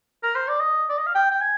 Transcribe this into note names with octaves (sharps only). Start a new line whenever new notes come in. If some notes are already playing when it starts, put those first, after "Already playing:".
A#4
C5
D5
D#5
D5
D#5
F5
G5
G5
G#5